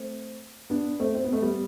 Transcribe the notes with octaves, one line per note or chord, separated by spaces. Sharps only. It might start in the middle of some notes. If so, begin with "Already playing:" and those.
Already playing: A3 C4
B3 D4
A3 C4
C4
B3
A3
G3 B3